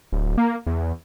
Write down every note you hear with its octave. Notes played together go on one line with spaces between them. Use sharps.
D1
A#3
E2